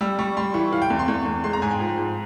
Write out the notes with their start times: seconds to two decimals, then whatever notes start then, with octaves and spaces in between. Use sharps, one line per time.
0.01 G3 E6
0.19 G3 C#6
0.37 G3 C6
0.54 E3 C#6
0.72 E3 F5
0.82 G5
0.90 E2
0.99 C6
1.08 E2 C#6
1.26 E2
1.44 G#3 C6
1.53 A#5
1.62 G#2 G#5
1.71 G5
1.80 F3
1.98 G#2